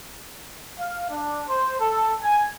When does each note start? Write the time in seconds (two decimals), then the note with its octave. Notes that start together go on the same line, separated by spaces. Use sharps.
0.79 F5
1.09 D4
1.47 C5
1.80 A4
2.21 G#5